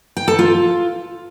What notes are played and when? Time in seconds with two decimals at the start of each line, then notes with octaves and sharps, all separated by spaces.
0.17 G5
0.28 A4
0.39 F4